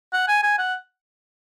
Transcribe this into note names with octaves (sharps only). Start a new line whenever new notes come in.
F#5
G#5
G#5
F#5